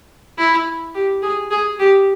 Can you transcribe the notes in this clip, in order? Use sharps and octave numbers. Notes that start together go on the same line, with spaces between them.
E4
G4
G#4
G#4
G4